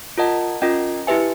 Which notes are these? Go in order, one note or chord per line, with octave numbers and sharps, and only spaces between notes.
F4 A#4 D#5 F#5 A5
C#4 F4 A#4 D#5 G5
E4 G4 B4 E5 G#5